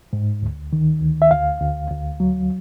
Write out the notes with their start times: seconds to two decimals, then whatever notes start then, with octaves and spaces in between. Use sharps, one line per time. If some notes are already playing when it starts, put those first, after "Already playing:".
0.13 G#2
0.42 D2
0.73 D#3
1.02 D2
1.22 E5
1.31 D2 F5
1.61 D2
1.90 D2
2.20 F#3